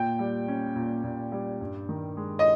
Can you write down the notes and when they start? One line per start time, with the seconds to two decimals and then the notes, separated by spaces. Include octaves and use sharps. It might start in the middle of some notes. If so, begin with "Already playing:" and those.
Already playing: A#2 G5
0.19 G3
0.48 C#4
0.76 A#2
1.04 A#2
1.32 G3
1.61 G2
1.89 D#3
2.17 G#3
2.39 D#5